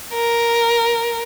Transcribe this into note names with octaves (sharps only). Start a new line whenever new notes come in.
A#4